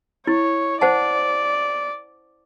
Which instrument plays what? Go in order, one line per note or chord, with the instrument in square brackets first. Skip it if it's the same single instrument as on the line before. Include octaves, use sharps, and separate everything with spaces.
[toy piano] E4 [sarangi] C#5
[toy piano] C5 F#5 A5 [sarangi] D5